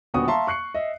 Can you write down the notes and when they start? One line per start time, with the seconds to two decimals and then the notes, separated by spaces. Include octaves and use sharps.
0.14 D#1 D3 B3 F#4 C#6 D#6
0.27 E5 F5 A5 A#5 C6 C#6
0.47 C#6 F#6 C7 C#7
0.74 D#5 E5